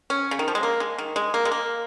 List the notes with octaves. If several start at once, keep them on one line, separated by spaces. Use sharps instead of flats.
C#4
C#3
D#3
F3
G#3
A#3
G#3
D#3
G#3
A#3
G#3
A#3